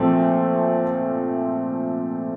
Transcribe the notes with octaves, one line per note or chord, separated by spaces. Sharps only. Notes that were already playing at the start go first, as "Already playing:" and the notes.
Already playing: A#2 F3 A3 C4